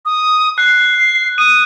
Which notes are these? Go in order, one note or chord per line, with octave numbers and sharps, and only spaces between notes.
D#6
F#6 C7
D#6 D#7